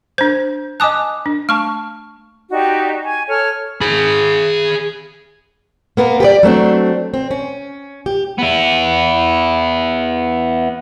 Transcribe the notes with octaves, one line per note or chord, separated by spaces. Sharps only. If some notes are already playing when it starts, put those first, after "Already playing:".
D4 C5 G6
D#5 G#5 A5 D6 D#6 F#6
D4
A3 A5 C#6 F6
D#4 F#4 G4 D5
G#5 C#6
A4 C#5 F6
G#4 B5
A#3 B3 A#4
G4 B4 D5
F#3 A3 C4 D4
C4
C#4
G4
B3 E4